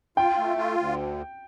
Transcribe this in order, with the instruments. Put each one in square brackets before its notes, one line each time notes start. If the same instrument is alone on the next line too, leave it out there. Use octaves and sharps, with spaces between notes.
[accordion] F4 [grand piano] G5
[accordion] A3
F4
D2